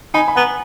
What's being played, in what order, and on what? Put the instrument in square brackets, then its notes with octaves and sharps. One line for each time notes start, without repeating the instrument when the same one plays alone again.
[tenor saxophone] D#4 [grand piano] G#5 B5
[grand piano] B5
[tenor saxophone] B3 [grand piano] F#5 A#5